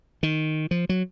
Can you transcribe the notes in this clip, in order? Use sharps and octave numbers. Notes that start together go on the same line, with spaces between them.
D#3
F3
F#3